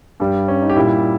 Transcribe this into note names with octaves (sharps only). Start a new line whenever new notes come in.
G2 G3
C#4
D#4
G4
A#2 G3 E4